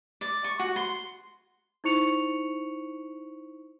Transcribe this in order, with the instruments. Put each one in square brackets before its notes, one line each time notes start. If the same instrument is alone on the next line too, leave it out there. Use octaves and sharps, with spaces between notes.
[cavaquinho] D5
C#6
F#4
C6
[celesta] D#4 E4 C5 C#6 C#7 F7